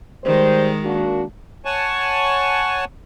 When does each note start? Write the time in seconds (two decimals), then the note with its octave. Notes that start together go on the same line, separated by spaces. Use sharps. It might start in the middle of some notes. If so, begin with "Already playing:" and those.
0.24 D#3 G3 G#3 C5
0.84 A#3 D4 F#4
1.65 C#5 F#5 G#5 A5 C#6